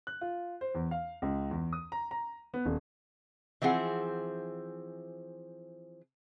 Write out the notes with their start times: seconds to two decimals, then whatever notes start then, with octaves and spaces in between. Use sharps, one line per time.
0.07 F#6
0.21 F4
0.61 C5
0.75 E2
0.91 F5
1.22 C#2
1.51 E2
1.73 D#6
1.92 A#5
2.11 A#5
2.54 B3
2.65 D#1
3.62 E3 F3 C4 G#4 F#5